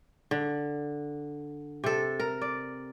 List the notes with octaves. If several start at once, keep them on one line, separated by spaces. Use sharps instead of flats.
D3
C3 A4
A#4
D5